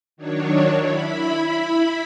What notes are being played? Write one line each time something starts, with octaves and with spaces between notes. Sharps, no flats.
D#3 F#3 D4 C#5
E4 B5